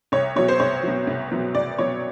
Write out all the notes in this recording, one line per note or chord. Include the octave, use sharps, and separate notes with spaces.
C2 C#5
B2 F#3 C#5
C5
C2 C#5
B2 F#3
C2
B2 F#3
C2 D5
B2 F#3 C#5